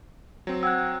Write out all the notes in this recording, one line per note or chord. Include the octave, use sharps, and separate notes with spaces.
F#3 C4
F#5 G5 E6 F#6 G#6